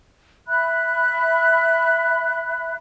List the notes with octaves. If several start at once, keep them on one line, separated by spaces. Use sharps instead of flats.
E5 B5 F#6